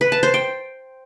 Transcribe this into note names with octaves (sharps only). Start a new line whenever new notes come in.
B4
A5
C5
G5